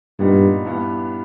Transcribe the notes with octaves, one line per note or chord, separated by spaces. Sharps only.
G2 A#2 G3 B3 D#4
G2 E3 G3 B3